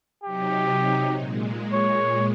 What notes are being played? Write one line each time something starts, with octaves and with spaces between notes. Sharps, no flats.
C3 F#3 D#4 G4
A#2 G#3
C#5